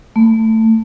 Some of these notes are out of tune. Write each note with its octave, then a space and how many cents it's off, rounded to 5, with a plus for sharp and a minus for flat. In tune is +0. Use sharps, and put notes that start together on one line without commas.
A3 +15